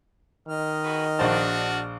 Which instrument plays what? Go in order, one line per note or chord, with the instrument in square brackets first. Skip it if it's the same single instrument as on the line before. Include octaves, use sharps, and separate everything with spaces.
[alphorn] D#3 [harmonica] D#5 F6
[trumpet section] F#4 G#4 B4
[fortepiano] A#1 C5 A5 [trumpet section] D4 F#4